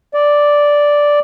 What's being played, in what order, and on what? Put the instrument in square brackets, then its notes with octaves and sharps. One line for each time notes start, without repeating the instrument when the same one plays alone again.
[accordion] D5